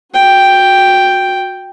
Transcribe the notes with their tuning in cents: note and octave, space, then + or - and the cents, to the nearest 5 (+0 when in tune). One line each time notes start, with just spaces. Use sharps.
F#4 -20 G5 +0